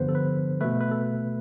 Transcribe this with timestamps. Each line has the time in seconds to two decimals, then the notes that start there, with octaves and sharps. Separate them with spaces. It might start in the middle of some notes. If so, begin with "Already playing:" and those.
Already playing: G2 D3 F3 B3 B4 C5
0.09 A4
0.15 B4
0.61 B2 A3 B4
0.80 B4
0.91 A4